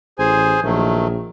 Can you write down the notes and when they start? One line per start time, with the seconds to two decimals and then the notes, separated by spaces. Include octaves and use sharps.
0.19 A1 G#4 C5 G#5
0.63 A#1 D#3 F#3 A3